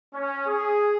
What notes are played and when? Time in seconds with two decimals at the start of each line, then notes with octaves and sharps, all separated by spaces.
0.14 C#4
0.47 G#4